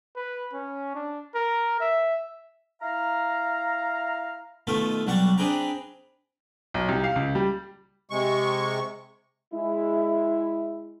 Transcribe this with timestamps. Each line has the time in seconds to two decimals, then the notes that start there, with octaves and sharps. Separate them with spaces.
0.16 B4
0.53 C#4
0.95 D4
1.35 A#4
1.80 E5
2.82 E4 F5 A#5
4.67 B2 D#3 A3 F4 A4
5.07 B1 F#3 G3 F#5 A5 C#6
5.38 C4 D4 G#4 B4 G5 A#5
6.74 B1
6.89 C2
7.04 F5
7.16 C#2
7.35 G3
8.10 C3 G#3 C#6
9.54 G#3 E4